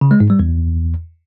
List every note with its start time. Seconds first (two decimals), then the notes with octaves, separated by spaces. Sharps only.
0.01 C#3
0.11 G#3
0.20 G#2
0.30 G3
0.39 E2